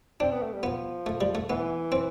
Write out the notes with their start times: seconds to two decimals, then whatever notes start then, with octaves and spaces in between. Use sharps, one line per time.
0.20 C4 D4
0.31 B3
0.43 A3
0.53 G3
0.63 F3 B3
1.06 A3
1.21 G3
1.35 A3
1.50 E3 B3
1.92 C4